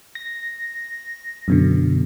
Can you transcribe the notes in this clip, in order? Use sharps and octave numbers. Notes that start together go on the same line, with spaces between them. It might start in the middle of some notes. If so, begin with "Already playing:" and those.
A#6
F#2 B2 D3